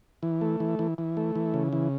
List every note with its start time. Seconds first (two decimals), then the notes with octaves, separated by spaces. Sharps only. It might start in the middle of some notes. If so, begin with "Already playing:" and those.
0.23 E3
0.41 A3
0.60 E3
0.79 E3
0.98 E3
1.17 A3
1.35 E3
1.54 C#3
1.73 E3